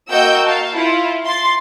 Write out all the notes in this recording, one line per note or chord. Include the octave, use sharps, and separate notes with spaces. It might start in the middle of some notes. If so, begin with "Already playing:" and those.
A#3 F#4 D#5 G5 E6 G6
F5 A5
E4 F4
C6 A6